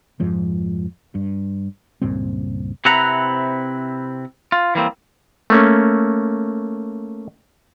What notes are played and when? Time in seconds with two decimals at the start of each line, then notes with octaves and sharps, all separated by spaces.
0.20 F2 G#2 F3
1.15 G2
2.02 C#2 G2 A#2 C4
2.85 C3 C4 E4 B4 F#5 A#5
4.52 F4
4.75 E3 G3 A#3 C4
5.50 A3 A#3 C#4